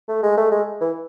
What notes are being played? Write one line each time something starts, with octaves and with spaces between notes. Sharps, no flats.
A3
G#3
A3
G#3
E3